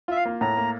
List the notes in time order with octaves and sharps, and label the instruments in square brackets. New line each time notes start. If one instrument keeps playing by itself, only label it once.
[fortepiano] F4 [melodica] E5
[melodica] F5
[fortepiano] A#3
[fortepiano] A2 [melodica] A#5
[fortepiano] A#3